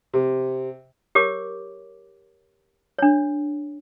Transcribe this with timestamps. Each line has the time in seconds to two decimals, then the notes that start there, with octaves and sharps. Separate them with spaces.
0.14 C3
1.15 G4 A#4 C#5 D6
2.99 D4 C#5